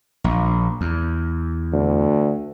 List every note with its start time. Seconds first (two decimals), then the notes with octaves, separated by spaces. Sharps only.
0.24 A#1
0.81 E2
1.73 D2